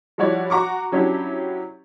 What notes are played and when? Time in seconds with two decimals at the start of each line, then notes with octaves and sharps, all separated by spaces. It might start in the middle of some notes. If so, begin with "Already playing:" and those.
0.18 F3 G3 E4 F#4 C#5 D5
0.50 F#4 A#5 C#6 D6
0.92 F#3 C#4 D4 E4 G4